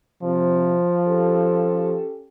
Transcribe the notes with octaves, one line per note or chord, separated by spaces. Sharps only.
C3 F3
C#4 G4 A4